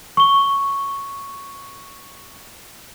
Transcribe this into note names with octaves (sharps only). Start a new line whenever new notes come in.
C#6 G7